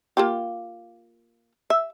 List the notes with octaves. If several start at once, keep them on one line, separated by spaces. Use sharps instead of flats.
A#3 F4 G4
E5